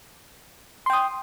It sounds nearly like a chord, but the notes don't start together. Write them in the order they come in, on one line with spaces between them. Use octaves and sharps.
C6 G5 D#6